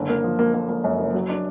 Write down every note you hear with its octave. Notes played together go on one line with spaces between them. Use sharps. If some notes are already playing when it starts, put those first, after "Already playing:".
Already playing: F#1 D3
A#3
F3
A#3
A#3
A#3
F#2
F#1
F#3
D4